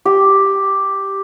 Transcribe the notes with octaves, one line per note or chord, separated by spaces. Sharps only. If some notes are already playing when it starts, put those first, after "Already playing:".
G4